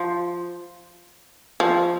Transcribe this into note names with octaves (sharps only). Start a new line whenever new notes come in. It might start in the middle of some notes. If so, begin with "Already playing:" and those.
Already playing: F3
F3